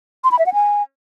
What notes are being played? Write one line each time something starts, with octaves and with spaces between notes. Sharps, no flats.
C6
B5
E5
F#5
G#5